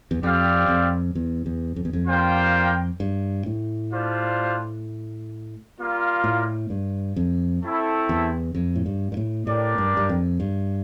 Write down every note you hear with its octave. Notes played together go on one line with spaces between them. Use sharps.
E2
F2 G3 C4 G4 D5 F5
F2
E2
E2
F2
E2
F2
G3 A#3 F4 C5 G5
G2
A2
G3 D4 F4 C5
G3 A#3 F4
A2
G2
F2
A3 C4 E4 A4
E2
F2
A2
G2
G2
A2
A2 D4 G4 A#4 D5
G2
G2
F2
G2